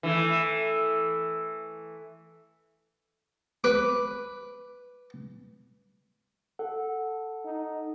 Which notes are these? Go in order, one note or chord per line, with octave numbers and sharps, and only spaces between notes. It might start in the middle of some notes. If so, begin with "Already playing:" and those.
E3 A3
B4 D6
A4 F#5
D#4